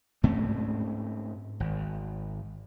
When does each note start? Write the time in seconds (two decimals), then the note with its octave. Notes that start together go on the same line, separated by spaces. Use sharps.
0.23 G#2 A3 C4 C#4
1.60 G#1